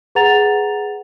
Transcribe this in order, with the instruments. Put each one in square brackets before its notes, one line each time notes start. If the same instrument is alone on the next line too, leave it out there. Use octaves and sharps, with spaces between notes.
[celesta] G#4 B4 F#5 A#5 A6 F7